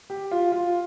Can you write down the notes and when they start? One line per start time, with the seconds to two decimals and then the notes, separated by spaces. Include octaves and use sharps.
0.10 G4
0.31 F4
0.52 F4